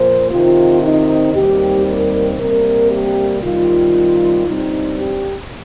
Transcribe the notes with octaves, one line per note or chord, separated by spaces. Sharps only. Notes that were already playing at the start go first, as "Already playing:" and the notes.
Already playing: A#2 F3 A#3 C5
C3 D#3 C4 F4
D#4
D#2 D#3 G3 C4 G4
A#4
C3 G3 A#3 A#4
G4
C3 D#3 G3 F4
G2 G3 C4 D#4
G4